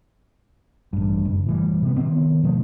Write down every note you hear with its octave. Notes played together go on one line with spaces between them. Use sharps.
A1 G2
F#1
A2 E3 G3
C3 B3
D#3 E3 B3 C4
B2 F3 A3 B3